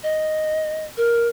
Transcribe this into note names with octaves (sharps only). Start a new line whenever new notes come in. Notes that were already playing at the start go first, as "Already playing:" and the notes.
D#5
A#4